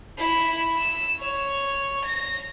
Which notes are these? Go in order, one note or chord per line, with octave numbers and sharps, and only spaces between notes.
E4
E6
C#5
A#6